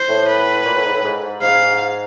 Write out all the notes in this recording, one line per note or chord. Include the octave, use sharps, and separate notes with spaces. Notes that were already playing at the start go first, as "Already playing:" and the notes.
Already playing: C5
A2
B4
A#2
A2
G#2
A2
G#2
G#2
G#2 F5